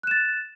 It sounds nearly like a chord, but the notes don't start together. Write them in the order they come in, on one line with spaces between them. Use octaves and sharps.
F#6 E7 A6